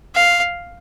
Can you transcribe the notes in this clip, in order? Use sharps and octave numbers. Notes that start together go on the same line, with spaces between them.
F5